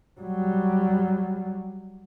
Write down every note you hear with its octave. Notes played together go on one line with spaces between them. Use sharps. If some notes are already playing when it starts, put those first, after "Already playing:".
F#3 G3